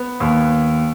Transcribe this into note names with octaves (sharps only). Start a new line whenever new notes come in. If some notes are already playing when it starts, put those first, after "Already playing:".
Already playing: B3
D#2